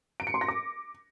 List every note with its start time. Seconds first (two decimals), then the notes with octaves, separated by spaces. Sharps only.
0.20 D7
0.27 C#7
0.34 C6
0.41 A#6
0.48 D6